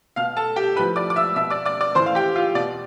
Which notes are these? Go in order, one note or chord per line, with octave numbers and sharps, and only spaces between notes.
B2 F5 F6
A4 A5
G4 G5
A2 F3 B4 B5
D5 D6
D6
E5 E6
B2 E5 E6
D5 D6
D5 D6
D5 D6
A2 E3 C5 C6
F5
G4 G5
F4 F5
B2 D5